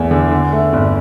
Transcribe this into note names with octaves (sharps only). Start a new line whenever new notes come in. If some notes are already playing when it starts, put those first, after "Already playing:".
Already playing: E2 A3 E4
D3
D3
A3
G1